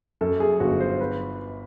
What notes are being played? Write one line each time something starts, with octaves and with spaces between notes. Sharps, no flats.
F#2 A4
G#4
G1 F#4
C5
B4